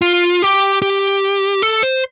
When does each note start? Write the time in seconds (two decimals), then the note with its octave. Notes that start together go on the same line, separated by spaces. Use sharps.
0.02 F4
0.42 G4
0.82 G4
1.62 A4
1.83 C5